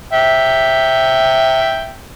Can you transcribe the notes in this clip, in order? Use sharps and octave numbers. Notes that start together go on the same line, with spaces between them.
E5 G5